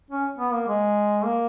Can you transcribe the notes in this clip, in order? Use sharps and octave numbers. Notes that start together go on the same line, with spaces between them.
C#4
B3
A#3
G#3
A#3